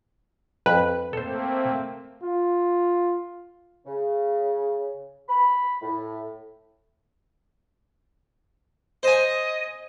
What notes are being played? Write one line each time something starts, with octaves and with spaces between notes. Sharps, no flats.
F2 B4
A3 A#3 C4 A4 C5
F4
C#3
B5
A2
C5 D#5 G#5